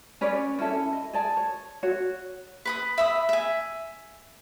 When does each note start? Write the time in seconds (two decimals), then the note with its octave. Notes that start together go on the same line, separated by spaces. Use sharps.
0.21 C#4 B4 C#5 D5
0.59 C#4 E4 A4
0.93 D#5
1.13 G#4 D5 A5
1.37 C#5
1.83 F#4 C#5
2.65 B4 B5 D#6
2.98 E5 B5 D#6
3.29 E5 G#5